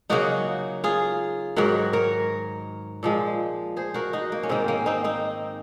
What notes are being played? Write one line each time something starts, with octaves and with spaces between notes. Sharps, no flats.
C#3 F#3 A#3 D#4 F#4
F4 G#4
G#2 D#3 F#3 F#4 A#4
A#4 C#5
A#2 F3 G#3
G#4 C5
F#4 A#4
D#4 F#4
A#3
C#4
G#2 D#3 A#3 C4
A#3 C#4
C4 D#4
C4 D#4